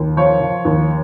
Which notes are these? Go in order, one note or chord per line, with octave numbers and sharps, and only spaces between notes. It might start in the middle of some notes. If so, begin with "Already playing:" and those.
Already playing: D#2
F3 C#5
F3
D#2